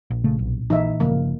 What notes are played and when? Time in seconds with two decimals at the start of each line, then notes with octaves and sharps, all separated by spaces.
0.10 A#1
0.24 C#3 A3
0.39 B1
0.70 A#2 E3 D#4 E5
1.00 G1 C#3 F3 A#3